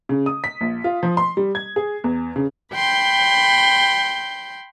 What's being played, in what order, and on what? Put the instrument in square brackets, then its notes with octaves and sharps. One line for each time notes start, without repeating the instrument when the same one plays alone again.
[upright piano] C#3
D#6
B6
A#1
F4
F3
C6
G3
G#6
G#4
E2
C#3
[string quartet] G5 B5 C6 G6